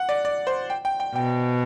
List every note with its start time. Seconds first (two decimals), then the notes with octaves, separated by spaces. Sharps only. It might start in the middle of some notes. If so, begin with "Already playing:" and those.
Already playing: F#5
0.09 D5
0.25 D5
0.47 C5
0.70 G5
0.85 G5
1.00 G5
1.15 B2 G5